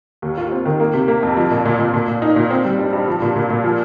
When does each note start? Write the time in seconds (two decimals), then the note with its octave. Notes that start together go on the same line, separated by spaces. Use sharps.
0.22 D#2
0.37 F4
0.52 C4
0.65 D#3
0.80 A#3
0.94 C3
1.08 A#3
1.23 F2
1.37 F3
1.51 A#2
1.65 A#2
1.79 A#2
1.94 A#2
2.08 A#2
2.22 D#4
2.36 A#2
2.50 C4
2.65 G3
2.79 G2
2.93 G2
3.08 F3
3.22 A#2
3.36 A#2
3.50 A#2
3.64 F3